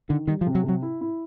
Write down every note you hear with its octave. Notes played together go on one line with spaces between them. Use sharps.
D3 D#3
D#3 G3
F3
C3
F#3
C3
F#3
E4
E4